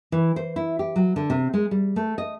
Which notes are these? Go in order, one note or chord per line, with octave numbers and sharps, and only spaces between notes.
E3
C5
E4
G4
F#3
D3
C3
G#3
G3
A3
D#5